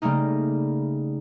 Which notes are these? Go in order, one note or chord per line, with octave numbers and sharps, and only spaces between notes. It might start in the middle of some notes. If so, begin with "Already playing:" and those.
C#3 G3 A3 A#3 D#4